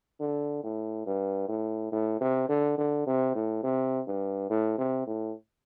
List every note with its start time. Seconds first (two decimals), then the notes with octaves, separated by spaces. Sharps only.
0.20 D3
0.63 A2
1.06 G2
1.48 A2
1.92 A2
2.21 C3
2.49 D3
2.78 D3
3.06 C3
3.35 A2
3.63 C3
4.07 G2
4.50 A2
4.78 C3
5.07 A2